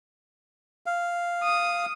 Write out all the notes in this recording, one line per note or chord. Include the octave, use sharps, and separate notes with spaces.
F5
D#6